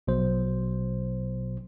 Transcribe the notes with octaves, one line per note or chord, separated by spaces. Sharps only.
A#1 B2 F#3 C5